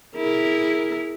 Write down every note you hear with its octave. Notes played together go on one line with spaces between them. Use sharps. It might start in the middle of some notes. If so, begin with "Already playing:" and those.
E4 G#4 A#4